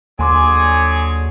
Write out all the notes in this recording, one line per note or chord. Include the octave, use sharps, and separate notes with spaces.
D#2 D3 F#3 G#4 G#5 C6 D6